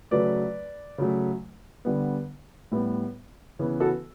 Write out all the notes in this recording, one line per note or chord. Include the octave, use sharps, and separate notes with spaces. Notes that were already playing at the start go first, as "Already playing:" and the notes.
C#3 F#3 A3 B4 D5
C#3 F#3 A3
D3 G3 B3
A2 G3 B3
C#3 E3 B3
F#4 A4